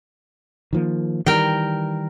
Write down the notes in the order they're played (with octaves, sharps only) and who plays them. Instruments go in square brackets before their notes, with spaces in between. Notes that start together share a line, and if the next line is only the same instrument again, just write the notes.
[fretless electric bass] D#3 F3 A#3
[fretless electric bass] D#3 E3 G3 [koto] A#4 G5